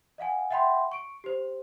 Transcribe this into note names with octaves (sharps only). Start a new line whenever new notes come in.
D#5 F5 F#5 G#5
E5 F#5 G5 B5 C6
C#6 D7
G4 C5